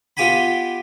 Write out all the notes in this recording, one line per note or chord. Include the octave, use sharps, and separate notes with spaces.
B3 F4 G4 G5 G#5 B5